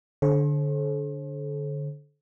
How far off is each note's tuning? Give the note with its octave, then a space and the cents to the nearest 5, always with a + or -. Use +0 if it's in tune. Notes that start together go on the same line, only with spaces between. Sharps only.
D3 +0 A4 -40 C5 +40